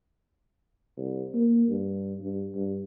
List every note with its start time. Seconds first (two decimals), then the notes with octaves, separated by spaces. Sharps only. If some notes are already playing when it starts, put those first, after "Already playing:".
0.97 C2
1.33 A#3
1.69 G2
2.21 G2
2.55 G2